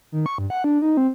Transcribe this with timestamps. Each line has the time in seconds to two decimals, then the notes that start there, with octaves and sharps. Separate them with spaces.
0.12 D#3
0.26 C#6
0.38 G2
0.50 F#5
0.64 D4
0.82 D#4
0.97 C4